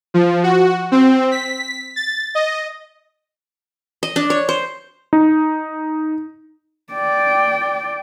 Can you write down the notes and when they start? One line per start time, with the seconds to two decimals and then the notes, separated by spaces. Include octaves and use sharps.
0.14 F3
0.43 F#4
0.92 C4
1.32 B6
1.96 A6
2.35 D#5
4.03 D#5
4.16 D4
4.30 C#5
4.49 C5
5.13 D#4
6.94 D5 G5